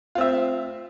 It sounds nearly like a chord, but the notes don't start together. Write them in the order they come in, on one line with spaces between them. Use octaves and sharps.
F4 C4 E5